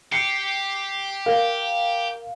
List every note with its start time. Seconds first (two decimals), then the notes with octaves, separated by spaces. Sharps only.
0.12 G4 C7 C#7
1.26 A#4 F5